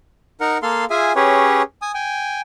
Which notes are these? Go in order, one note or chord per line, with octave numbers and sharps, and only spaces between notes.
D#4 A#4 F#5
A#3 A4 F5 C6
F4 G#4 E5 G#5
C#4 G4 G#4 B4 C#5
G#5 D#6
G5 G#5